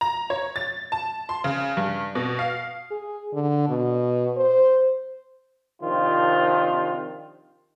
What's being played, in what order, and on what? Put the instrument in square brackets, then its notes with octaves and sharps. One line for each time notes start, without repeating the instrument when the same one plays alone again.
[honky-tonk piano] A#5
C#5
A6
A5
C6
C#3
G2
B2
F5
[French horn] G#4
D3
B2
C5
[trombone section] C3 D#3 F3 C4 D4 F4